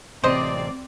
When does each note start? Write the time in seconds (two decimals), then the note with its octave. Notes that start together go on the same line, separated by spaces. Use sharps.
0.24 A1 C3 C4 C5 D5 D#5